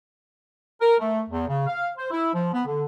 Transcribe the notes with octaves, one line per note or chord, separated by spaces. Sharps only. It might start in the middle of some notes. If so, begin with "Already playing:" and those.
A#4
A3
E2
C#3
F5
C5
E4
F3
B3
D3